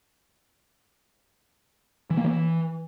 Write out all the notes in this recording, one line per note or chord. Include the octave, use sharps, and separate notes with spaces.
E3
A#3
E3